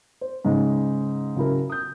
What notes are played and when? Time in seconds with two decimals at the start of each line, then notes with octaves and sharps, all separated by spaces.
0.21 C5
0.45 G#2 C#3 G#3 D#4
1.36 C#3 F#3 E4 A#4
1.70 D#6 G6